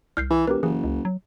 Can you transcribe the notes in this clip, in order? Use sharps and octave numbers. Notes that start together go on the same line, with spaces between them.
C2 F6 G6 C7
E3
E1 G4 A#4 B4
F#1 E3 G#4
C#2
F#3